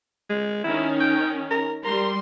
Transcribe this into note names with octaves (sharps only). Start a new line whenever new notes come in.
G#3
D#3 C#4 E4
G5
A#4
G3 A#4 C6